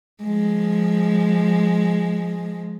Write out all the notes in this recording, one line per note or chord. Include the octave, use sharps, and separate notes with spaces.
F3 G#3